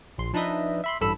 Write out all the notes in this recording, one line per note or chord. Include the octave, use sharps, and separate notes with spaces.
A#1 C6
F3 D4 D#4 B4 D#5 E5
E5 B5 C6
A1 G2 A4 B5 E6